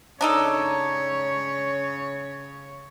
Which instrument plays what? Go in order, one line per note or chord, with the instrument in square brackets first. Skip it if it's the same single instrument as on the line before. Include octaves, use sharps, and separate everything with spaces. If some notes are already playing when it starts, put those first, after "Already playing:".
[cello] C#3 C#5 [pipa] D4 D#4 A4